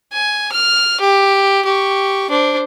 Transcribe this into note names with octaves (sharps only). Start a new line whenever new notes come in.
G#5
F6
G4
G4 C#6
D4 C5